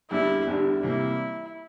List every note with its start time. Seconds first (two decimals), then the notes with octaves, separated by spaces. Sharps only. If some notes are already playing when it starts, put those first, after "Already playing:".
0.10 E2 D3 G3 D4 E4 G4
0.47 E2 D3 G3 D4 G4
0.83 C3 E3 G3 A#3 E4